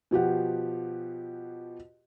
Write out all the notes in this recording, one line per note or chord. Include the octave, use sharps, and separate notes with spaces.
B2 F3 G4 F#5